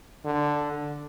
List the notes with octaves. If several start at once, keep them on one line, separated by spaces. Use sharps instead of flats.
D3